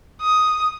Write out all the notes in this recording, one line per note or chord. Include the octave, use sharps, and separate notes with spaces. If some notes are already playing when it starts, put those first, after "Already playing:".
D#6